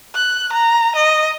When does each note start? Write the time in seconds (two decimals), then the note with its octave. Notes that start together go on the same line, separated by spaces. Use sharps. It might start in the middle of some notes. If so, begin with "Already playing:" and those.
0.15 F#6
0.53 A#5
0.96 D#5